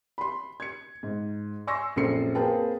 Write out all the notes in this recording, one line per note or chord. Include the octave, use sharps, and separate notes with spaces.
B5 C6
G#6 C#7
G#2
G#5 C6 C#6 E6 A#6 C7
A#1 F#2 C4 A4 C7 C#7
A#3 C4 G#4 B4 G5 A5